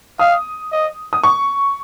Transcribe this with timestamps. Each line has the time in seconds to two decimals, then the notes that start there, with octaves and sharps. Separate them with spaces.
0.19 F5 D#6
0.72 D#5
1.13 D#6
1.24 C#6